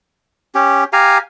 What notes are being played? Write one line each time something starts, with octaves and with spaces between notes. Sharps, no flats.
C#4 G4
G4 F5 G#5 A#5